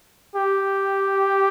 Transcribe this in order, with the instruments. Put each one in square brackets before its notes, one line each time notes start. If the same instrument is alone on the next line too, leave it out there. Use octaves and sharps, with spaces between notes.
[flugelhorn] G4